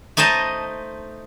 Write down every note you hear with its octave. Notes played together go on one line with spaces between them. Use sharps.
A3 D#4 C5 D#5 A5